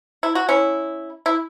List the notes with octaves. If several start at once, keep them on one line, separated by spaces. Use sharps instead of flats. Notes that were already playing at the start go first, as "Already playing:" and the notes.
E4
F#4
C#4 E4
E4